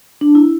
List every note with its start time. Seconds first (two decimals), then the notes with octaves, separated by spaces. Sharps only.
0.21 D4
0.35 E4